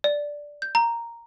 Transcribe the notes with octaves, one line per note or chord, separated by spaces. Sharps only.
D5
G6
A#5